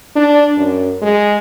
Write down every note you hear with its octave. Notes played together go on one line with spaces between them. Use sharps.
D4
F#2
G#3